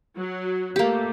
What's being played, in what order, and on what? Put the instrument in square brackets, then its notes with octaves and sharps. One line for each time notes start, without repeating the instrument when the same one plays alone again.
[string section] F#3
[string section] A#2 A3 [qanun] A#3 G4